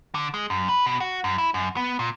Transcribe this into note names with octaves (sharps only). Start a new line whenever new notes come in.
D3
G#3
F#2
B4
B2
F#4
F#2
E4
F#2
B3
A#2